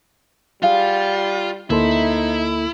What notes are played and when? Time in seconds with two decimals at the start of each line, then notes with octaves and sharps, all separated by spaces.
0.63 G3 F4 G#4 F5 F#5
1.70 D2 A#3 D#4 E4 A4 C5 E5